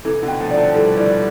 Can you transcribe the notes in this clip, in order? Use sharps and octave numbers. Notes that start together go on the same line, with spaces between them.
C3 E3 A4
B2 D3
G5
F3 A3
D5
F3 A3
E3 G3 A4
E3 G3 D5